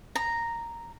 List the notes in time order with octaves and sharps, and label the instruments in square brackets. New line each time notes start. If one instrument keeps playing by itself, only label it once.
[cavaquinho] A#5